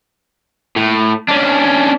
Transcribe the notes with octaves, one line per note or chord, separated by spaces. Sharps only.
A2
C#4 D4